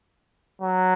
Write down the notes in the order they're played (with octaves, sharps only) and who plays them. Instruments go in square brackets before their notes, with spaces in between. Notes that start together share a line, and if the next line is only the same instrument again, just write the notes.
[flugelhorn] F#3